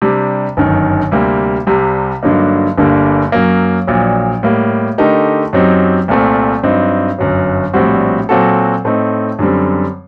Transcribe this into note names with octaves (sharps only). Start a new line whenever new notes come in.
C3 G3 D4
G1 F#2 D#3
D2 C3 G3 A#3
C2 C3 G3
G2 D3 F#3 A#3 D#4
G1 G2 D3 G3 A#3
F#2 F#3 A#3
A#1 A#2 F#3
A2 G3 A#3
D3 A3 D#4 G4 A#4
F#2 F#3 C4 D#4 G4
C2 A#2 A3 C4
G2 F#3 C4 D#4
G1 F#2 F#3
A#1 A2 G3 C4 F#4
A#2 F#3 C4 F#4 A4
A2 A3 C4 D#4
F#2 D3 G3 C4